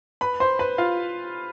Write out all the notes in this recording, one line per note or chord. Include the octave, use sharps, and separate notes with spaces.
B4 B5
C5 C6
B4 B5
F4 F5